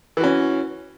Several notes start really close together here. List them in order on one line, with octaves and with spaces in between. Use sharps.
E3 F#4 C#4